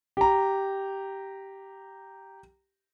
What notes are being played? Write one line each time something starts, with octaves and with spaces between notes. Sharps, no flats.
G4 A#5